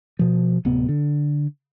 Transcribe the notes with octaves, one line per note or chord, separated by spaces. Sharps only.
B2 F3
D1 C3 B3
D3